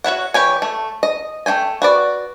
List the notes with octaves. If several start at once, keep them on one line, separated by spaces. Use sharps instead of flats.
F#4 C#5 E5 F#5
E3 G4 C#5 G#5
A3
D#5
A3 F#4 G5 G#5
F#4 B4 D5